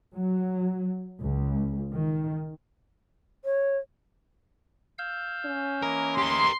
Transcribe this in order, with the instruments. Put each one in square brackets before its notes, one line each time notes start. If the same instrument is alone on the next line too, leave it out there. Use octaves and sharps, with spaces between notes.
[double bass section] F#3
C#2
D#3
[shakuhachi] C#5
[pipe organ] F5 E6 G6
[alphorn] C#4
[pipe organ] E3 A#3 D#5 [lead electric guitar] A#4
[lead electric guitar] G4 A#4 [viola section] C6